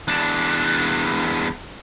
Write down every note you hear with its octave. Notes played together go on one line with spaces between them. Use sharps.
E2 D4